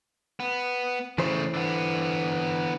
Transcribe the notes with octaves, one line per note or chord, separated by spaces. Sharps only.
B3
C#3 E3 A3 C5
D3 B3